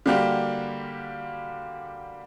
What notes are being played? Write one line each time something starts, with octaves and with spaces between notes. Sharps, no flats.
D3 G3 A#3 F#4 G4